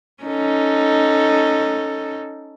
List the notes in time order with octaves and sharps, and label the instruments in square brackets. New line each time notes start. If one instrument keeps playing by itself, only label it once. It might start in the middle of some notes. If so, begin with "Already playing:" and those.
[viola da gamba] C#4 D#4 A4